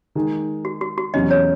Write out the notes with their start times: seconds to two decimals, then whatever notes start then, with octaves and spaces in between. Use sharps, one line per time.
0.15 D#3 G#3 D#4 G#4
0.65 F#4
0.81 F#4
0.98 F#4
1.14 E2 C3 F#3 C#4 D#5
1.31 C#5